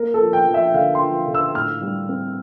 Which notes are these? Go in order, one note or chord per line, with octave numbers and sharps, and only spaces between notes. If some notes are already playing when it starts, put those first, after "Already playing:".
Already playing: A#3 A#4
A4
F3
G5
F3
E5
D3 F5
C6
F3
D3
E6
A2 F6
G3
C4